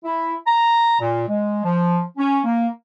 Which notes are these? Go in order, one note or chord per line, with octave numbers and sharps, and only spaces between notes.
E4
A#5
A#2
G#3
F3
C#4
A#3